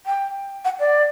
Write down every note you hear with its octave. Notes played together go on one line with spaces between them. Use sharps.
G5
F#5
D5